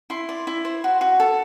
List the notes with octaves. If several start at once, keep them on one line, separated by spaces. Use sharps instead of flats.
E4 C6
D5
E4
C5
F#4
F#4
A4